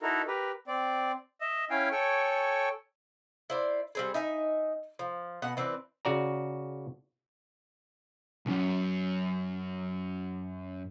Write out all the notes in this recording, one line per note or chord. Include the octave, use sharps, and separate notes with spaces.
D#4 E4 F#4 A4 A#4
G4 A#4 B4
C4 D5
D#5 E5
C#4 E4 F5 G5 G#5
A4 C#5 G5 G#5 C#6
E4 C5 D5
G3 C4 G#4
D#4 E5 G#5
F3
B2 B3 F#5
E3 C4 D4 B4
C#3 F#4 D5 A#5
C2 F#2